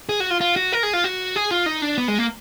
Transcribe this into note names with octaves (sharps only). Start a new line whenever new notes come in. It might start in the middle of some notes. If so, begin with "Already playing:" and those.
G#4
F#4
F4
F4
F#4
A#4
G#4
F4
F#4
G#4
F4
D#4
D4
B3
G#3
A#3